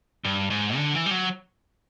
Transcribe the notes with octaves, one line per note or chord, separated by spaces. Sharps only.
G2
G#2
D3
E3
G3
F#3